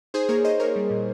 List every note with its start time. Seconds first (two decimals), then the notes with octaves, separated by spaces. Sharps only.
0.14 D#4 G#4 C5
0.29 A#3 A#4 C#5
0.45 D#4 C5 D#5
0.60 A#3 A#4 C#5
0.76 G3
0.90 A#2